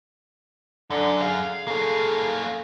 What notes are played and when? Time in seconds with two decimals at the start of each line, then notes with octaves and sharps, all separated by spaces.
0.90 F#2 D3
1.22 G#4 F5
1.68 A#3 C#4 A4